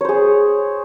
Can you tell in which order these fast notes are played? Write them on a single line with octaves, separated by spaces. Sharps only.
C#5 C5 G#4